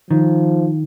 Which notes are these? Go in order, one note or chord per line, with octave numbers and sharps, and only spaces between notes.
D#3 F3